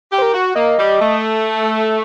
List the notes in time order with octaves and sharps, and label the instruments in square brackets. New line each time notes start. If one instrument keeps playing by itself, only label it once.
[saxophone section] G4
[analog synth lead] C5
A#4
[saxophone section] F#4
[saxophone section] A#3 [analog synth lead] D#5
[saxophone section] G3
A3